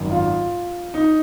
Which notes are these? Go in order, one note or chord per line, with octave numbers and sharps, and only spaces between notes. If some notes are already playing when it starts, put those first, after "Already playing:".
Already playing: G#1 F#2 D#3
F4
D#4